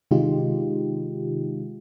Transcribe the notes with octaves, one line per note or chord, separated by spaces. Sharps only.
C3 D#3 G#3 D#4 F4 G4